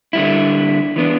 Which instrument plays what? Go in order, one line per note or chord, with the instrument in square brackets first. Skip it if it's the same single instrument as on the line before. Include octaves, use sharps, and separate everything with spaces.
[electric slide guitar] D3 G3 E4
E3 B3 D4